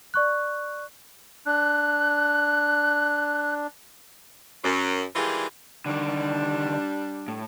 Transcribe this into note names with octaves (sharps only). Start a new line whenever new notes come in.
D5 C#6 F#6
D4 F#6
F#2
D#3 E3 G3 G#3 F4 D5
D3 D#3 G3 D4
A2